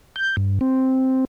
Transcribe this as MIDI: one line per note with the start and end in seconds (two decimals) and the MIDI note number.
0.16 0.36 91
0.37 0.59 43
0.61 1.25 60